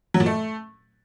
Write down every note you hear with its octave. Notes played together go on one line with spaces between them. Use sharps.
F#3
A#2
A3